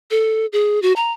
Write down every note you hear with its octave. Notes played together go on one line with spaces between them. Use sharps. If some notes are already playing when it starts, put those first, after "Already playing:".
A4
G#4
F#4
A#5